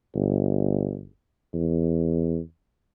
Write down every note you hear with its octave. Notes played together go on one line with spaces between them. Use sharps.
G1
E2